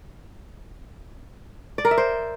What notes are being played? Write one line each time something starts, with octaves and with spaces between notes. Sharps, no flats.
D5
A#4
E5
C5